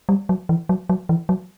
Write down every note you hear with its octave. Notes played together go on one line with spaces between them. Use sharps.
G3
F#3
E3
F#3
F#3
E3
F#3